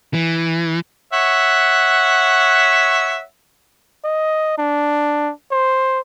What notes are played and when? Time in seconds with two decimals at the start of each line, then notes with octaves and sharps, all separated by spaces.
0.14 E3
1.13 C#5 E5 F#5
4.04 D#5
4.58 D4
5.51 C5